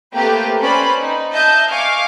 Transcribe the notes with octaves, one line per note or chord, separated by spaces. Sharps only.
A3 A#3 C4 G4 B4 G5
C#4 B4 C5 D5 B5
D#4
D#5 E5 A5 G6
F5 G#5 C#6 D6